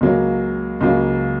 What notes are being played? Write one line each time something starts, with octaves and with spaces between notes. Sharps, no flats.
C#2 C#3 F#3 A#3
C#2 C#3 F#3 A#3